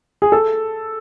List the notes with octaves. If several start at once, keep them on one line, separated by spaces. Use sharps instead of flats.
G#4
A4